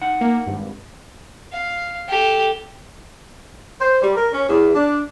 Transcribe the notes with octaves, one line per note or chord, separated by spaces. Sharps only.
D#4 F#5
A#3
G#1 G2
F5
G4 A4
C5
G3
A#4
C#4
E2
D4